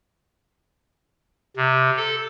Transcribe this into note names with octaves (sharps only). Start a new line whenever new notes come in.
C3
A4